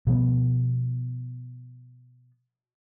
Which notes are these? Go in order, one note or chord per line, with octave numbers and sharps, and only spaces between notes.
B2 F3 B3